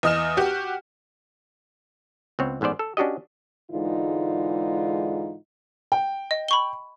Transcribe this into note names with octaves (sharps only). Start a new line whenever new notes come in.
E2 D#5 D#6 F6 E7
F#4 G4
C#2 B3 C4 C#5
A1 G#2 B3 C5 D5
A4
C#4 D4 F#4 G4 D#5
G#2 D3 E3 G#3 D#4 F4
G5
D#5
B5 C#6 G7